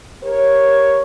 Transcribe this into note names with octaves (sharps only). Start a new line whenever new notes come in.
G4 A#4 C#5